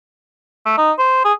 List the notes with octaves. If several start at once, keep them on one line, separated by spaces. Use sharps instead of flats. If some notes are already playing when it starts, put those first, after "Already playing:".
A3
D#4
C5
G#4